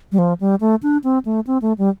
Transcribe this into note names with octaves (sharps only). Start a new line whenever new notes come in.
G3
F3
G3
A3
D4
C4
A3
C4
A3
G3